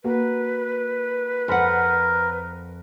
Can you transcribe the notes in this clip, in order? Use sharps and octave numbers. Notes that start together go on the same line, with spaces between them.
A#3 F#4 A#4 B4
F2 A#4 C5 F#5 B5